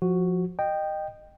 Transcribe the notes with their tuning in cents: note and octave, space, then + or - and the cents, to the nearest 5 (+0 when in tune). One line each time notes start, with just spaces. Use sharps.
F3 +15 F#4 +0
D#5 -20 G5 +0